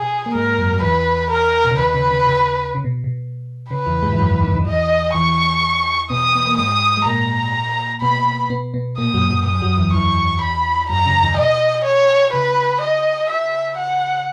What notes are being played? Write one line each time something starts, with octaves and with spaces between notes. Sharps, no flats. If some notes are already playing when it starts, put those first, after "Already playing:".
Already playing: B2 G#4
A#3
G#2 G#3 A#4
F#2 F#3
F#3
E2 E3 B4
A#4
B2
C#3
D#2 D#3 B4
C#3
C#3
C#3
C#3
B2
B2
C#3 B4
E2 E3
G#2 G#3
E3
F#2 F#3
E2 E3
D#2 D#3
D#2 D#3
E2 E3 D#5
E2 E3 C#6
B2 B3 D#6
B3
A#3
G#2 G#3 D#6
G#3
A#2 A#3 A#5
B2 B3 B5
B2 B3
B2 B3
A#2 A#3 D#6
F#2 F#3
F#2 F#3
F#2 F#3 D#6
F#2 F#3
E2 E3
E2 E3 C#6
B5
F#2 F#3 A#5
C#3
D#2 D#3
B2 D#5
C#5
C#3 B4
D#5
E5
F#5